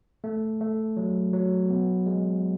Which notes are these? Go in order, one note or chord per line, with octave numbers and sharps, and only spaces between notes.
A3
A3
F#3
F#3
B3
G#3